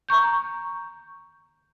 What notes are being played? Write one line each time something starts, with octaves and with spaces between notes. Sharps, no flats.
A#5 C#6 G6